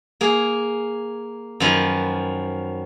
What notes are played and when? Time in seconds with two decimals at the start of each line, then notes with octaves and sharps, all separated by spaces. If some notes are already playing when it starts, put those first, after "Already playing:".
0.21 A#3 G#4
1.60 F#2 D#3 F3 B4